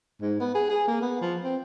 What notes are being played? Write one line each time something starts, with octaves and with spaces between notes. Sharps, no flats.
G#2
B3
G#4
G#4
A#3
B3
F3
C4